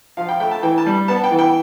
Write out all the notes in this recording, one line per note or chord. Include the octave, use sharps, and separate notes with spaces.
F3 F5
G5
A3 G5
A5
E3 G5
A5
G3
B3 A5
G5
E3
G5